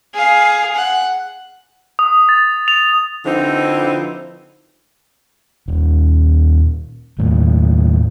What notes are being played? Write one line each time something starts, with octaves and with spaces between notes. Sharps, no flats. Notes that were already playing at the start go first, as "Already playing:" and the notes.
G#4 F5
F#5
D#6
A6
F7
D3 F3 C4 D#4 E4 B4
D#1
D#2 A2